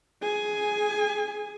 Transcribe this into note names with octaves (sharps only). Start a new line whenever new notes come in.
G#4 G#5